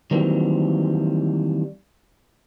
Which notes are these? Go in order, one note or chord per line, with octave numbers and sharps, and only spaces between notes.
D#3 E3 F#3 G3 A#3 C4